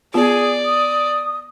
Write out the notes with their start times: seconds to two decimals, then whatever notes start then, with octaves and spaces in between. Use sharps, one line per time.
0.14 B3 F4 G#4 D5
0.65 D#6